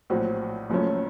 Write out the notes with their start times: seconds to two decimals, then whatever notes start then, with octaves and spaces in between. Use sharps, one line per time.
0.10 A#1 A2 F#3 C4 F#4
0.70 F#1 F#2 F3 A3 C#4